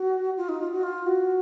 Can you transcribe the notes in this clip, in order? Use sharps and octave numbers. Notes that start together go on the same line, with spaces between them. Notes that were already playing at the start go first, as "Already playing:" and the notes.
Already playing: F#4
F4
D#4
F4
F#4
F4
F#4